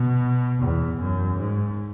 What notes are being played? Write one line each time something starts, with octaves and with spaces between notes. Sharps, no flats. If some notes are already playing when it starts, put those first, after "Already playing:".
Already playing: B2
E2
F#2
G#2